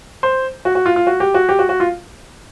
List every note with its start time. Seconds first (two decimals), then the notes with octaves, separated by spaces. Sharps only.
0.23 C5
0.65 F#4
0.75 F#4
0.86 F4
0.96 F4
1.07 F#4
1.20 G4
1.34 F#4
1.49 G4
1.59 F#4
1.69 F#4
1.80 F4